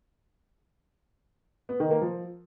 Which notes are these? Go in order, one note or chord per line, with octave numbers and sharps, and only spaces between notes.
B3
D#3
A#3
F3